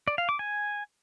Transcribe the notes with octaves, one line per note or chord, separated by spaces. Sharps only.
D5
F5
D6
G#5